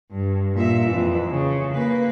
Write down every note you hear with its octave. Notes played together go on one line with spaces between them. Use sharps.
G2
A#2 E5
F2 E3
C#3
A#3 B4